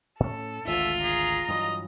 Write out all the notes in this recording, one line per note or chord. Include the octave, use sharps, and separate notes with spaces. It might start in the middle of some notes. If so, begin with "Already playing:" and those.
A2 C#4 A4
G#1 D2 F4 E5
G#4 A#5
G2 E3 F#3 D#5